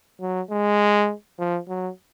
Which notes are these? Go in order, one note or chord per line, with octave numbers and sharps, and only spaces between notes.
F#3
G#3
F3
F#3